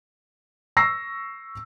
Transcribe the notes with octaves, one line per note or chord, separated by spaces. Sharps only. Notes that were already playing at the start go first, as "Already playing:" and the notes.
C#6 E6 A#6 C7